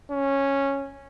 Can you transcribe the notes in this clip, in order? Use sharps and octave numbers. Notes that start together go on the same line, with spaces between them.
C#4